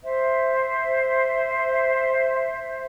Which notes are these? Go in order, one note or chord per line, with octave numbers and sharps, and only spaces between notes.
C5 E5